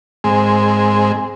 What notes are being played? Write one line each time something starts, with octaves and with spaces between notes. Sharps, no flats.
G#2 G#3 C4